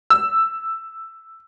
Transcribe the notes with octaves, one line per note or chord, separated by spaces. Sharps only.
E6